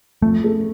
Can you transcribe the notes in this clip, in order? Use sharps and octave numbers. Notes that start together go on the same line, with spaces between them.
F2 A3
A3